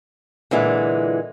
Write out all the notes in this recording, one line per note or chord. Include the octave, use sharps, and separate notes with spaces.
A#2 D3 E3 G#3